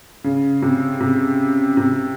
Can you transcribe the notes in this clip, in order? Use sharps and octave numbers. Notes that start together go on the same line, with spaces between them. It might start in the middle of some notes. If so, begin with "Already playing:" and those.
C#3
C3
C3
C3